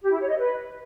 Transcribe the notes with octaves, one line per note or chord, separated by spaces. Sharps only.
G4
E4
C#5
D#5
B4